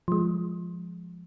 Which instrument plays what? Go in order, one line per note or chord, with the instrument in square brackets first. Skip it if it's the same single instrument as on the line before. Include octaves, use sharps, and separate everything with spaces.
[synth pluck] F3 G#3